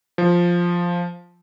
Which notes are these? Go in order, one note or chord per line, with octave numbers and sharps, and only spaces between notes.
F3